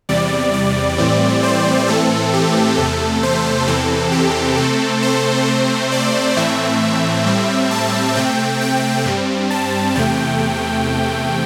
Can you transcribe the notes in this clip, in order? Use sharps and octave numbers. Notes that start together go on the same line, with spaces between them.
E2 C3 G3 D5
D5
A2 E3 G3 C4
C5
A2 E3 A3 C4 A4
G4
E2 C3 A3 A4
C5
E2 C3 E3 C4 A4
G4
C3 A3 C4 A4
C5
C3 A3 C4
D5
A2 E3 A3 C4 E5
A2 G3 C4
A5
C3 A3 C4 G5
G5
G2 G3 C4
A5
E2 C3 A3 G5